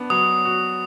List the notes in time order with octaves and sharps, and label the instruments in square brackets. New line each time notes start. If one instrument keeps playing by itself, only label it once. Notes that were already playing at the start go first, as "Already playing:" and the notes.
Already playing: [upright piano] B3 D4
[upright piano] F#3 [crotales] D#6
[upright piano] F#4